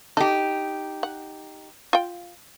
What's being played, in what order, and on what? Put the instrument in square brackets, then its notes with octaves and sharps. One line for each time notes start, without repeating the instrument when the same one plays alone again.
[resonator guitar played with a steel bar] D#4 G4 [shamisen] A4
[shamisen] F#5
F4 G5